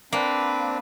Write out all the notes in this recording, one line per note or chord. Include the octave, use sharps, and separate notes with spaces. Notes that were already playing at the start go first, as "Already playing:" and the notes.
A#3 C4 D4 B4